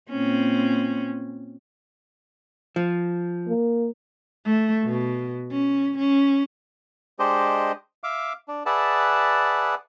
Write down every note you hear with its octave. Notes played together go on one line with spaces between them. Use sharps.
A#2 C4 C#4
F3
A#3
A3
B2
C#4
C#4
G#3 D4 G4 C5 D#5
E5 F5 D6
D4
G#4 B4 D5 E5 F#5 A5